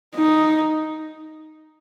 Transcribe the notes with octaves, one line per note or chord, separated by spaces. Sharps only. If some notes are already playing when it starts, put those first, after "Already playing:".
D#4